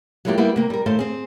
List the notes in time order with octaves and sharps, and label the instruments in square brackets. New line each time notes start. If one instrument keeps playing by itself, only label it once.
[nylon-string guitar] F#3 G#3 A#3 E4 F4 G4
G3 A#3 B3 E4 G4
C3 A#3
G3 A#4
A2 D#3 A4 C5 F5
C4 G#4